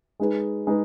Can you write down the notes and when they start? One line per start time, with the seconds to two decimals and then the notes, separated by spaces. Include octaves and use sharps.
0.20 G#3 D#4 G#4 B4
0.67 G#3 D#4 G#4 B4